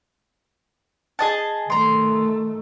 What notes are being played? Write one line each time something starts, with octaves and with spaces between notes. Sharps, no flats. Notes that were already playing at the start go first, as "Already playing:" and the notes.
G#4 D#5 A5
D#3 A3 A#5 C6